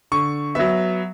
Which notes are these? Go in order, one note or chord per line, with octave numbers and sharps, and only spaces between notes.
D3 C#6
F#3 B3 E5